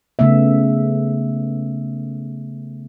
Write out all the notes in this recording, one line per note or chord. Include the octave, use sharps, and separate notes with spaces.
C#3 A3 B3 E5